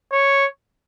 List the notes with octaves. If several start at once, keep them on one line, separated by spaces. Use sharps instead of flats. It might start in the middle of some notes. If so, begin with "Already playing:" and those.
C#5